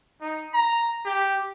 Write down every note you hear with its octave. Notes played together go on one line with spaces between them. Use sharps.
D#4
A#5
G4